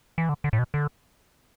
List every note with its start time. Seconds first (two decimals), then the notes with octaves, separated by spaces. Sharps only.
0.18 E3
0.29 D3
0.44 D3
0.53 A2
0.59 B2
0.74 D3